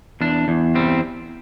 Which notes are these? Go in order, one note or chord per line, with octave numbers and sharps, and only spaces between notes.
E2 D4
E2
G3 C4